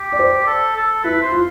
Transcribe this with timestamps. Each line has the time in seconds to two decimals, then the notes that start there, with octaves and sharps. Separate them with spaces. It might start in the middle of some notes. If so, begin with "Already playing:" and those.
Already playing: G4
0.12 D5
0.19 C5
0.47 A4
0.76 A4
1.04 E4 B4
1.22 C5
1.32 F4